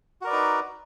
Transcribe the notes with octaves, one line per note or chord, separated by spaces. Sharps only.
D#4 F#4 A#4 B4 D5